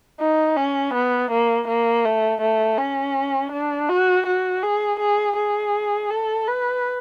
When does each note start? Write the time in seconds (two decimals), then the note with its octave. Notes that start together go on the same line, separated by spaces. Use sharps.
0.21 D#4
0.57 C#4
0.94 B3
1.31 A#3
1.68 A#3
2.05 A3
2.41 A3
2.79 C#4
3.52 D4
3.89 F#4
4.27 F#4
4.63 G#4
5.00 G#4
5.36 G#4
6.11 A4
6.48 B4